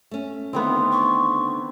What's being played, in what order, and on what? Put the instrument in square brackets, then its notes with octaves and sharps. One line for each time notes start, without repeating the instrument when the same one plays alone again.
[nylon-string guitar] A3 C#4
[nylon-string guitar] D3 D#3 A3 [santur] B3 C4
[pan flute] C#6